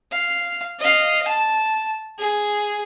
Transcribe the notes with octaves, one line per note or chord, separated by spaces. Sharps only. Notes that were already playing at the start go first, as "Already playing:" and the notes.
F5
D#5 F5
A5
G#4